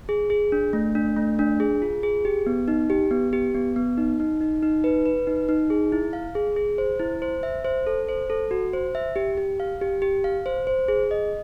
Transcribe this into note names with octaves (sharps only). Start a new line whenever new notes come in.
G#4
G#4
D4
A3
D4
A3
D4
G#4
F4
G#4
G4
B3
D#4
G4
B3
G4
B3
B3
D#4
D#4
D#4
D#4
B4
B4
D#4
D#4
G#4
E4
F5
G#4
G#4
C5
E4
C5
E5
C5
A4
C5
A4
F#4
C5
E5
G4
G4
F5
G4
G4
F5
C5
C5
G#4
D#5